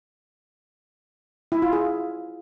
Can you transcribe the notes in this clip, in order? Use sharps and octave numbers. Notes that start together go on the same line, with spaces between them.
E4
F4
G#4